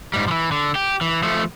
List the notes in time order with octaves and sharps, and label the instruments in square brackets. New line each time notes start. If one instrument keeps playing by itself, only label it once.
[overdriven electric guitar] G#2 G3
E3 F3
D3
G4
E3
F3 A3